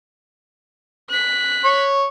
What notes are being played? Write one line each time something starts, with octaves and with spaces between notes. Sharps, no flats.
F#6 B6
C#5